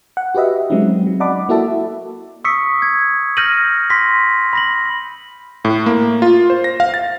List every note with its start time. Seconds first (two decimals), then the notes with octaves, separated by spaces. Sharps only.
0.17 F#5
0.35 F#4 G4 B4 D#5 E5
0.70 F#3 G#3 C4 C#4 D#4
1.07 F#3
1.20 D5 D#5 F#5 A5 B5 D6
1.49 A#3 E4 F#4 A4 E5 A5
2.44 C#6 D#6 E6 B6 C#7
2.82 G#6
3.37 F6 G6 A#6 C#7 D#7 F#7
3.90 C6 A#6 B6
4.53 B5 A#6 F#7
5.65 A2
5.86 A#3
6.22 F4
6.50 C5
6.64 A#6
6.80 F5
6.94 A6